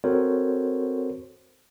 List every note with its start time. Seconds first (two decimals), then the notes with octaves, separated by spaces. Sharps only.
0.04 C4 F#4 A4 A#4 C5 C#5